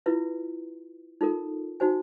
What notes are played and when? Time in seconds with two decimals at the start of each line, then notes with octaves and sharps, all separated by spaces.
0.06 E4 F4 B4 E5
1.21 D#4 F4 A4 A#4
1.80 D#4 F#4 C5 G#5